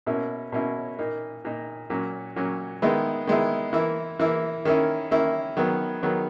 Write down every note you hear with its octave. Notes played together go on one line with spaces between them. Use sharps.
B2 A#3 C#4 E4
B2 A#3 C#4 E4
A#2 A#3 D#4
A#2 A#3 D#4
A#2 F#3 C#4
A#2 F#3 C#4
D#3 G#3 B3 E4
D#3 G#3 B3 E4
E3 A#3 E4
E3 A#3 E4
D#3 A#3 C#4 E4
D#3 A#3 C#4 E4
D#3 F#3 B3
D#3 F#3 B3